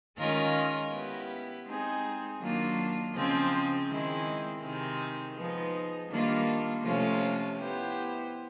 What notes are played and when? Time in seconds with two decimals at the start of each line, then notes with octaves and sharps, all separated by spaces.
0.17 D#3 G#3 C#4 F4 A#4
0.91 B3 E4 G4
1.65 G#3 C4 D#4 G#4
2.39 D#3 F#3 A#3 D4 F4
3.13 C#3 F3 G#3 C4
3.87 D#3 G#3 C4 E4 G#4
4.61 C3 D#3 G#3 C4
5.35 F3 G#3 B3 D#4
6.10 D#3 G3 A#3 D4 F4
6.83 C3 F3 A3 C#4 F4
7.57 B3 E4 G4 C5